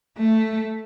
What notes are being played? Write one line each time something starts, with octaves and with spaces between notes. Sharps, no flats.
A3